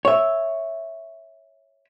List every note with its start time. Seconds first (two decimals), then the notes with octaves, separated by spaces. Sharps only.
0.05 C#5 E5